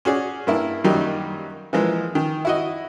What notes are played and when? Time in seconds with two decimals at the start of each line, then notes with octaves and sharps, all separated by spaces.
0.05 C#4 F#4 G#4 D5
0.47 G2 A#3 E4
0.84 F#2 D#3 F#3 G3 A#3 D#4
1.73 E3 F3 G#3 A#3
2.15 D#3
2.45 E4 F#4 D#5